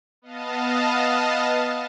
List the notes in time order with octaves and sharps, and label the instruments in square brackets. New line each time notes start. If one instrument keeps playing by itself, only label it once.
[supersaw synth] B3 D#5 F5 A5